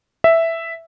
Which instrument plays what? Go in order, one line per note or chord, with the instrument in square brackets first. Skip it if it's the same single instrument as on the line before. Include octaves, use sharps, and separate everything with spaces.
[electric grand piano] E5